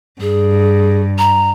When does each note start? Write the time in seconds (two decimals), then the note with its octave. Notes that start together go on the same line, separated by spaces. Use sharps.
0.21 G2 G#4
1.18 A#5